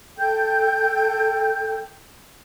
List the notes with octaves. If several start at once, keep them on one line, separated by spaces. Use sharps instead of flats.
A4 G5 G6